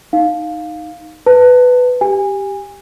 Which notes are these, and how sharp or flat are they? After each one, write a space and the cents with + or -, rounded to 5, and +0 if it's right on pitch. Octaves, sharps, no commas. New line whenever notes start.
D#4 +0 F5 +10
B4 +10 A5 +30
G4 +0 G#5 -25